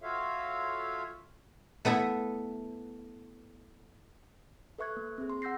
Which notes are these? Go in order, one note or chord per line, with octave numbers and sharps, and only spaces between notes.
F4 F#4 A4 C#5 E5 F5
A3 B3 E4 A4
A4 B4 E5 C#6 F#6 G#6
A#3
C4 G#4
C6
F#5 E6 G6 A#6 C7